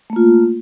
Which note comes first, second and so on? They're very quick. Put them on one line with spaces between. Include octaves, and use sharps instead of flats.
A3 A#3 F4